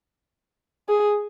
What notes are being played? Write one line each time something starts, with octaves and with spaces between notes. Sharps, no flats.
G#4